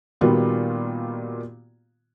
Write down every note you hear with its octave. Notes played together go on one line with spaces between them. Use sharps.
A#2 D#3 G3 B3 F4 F#4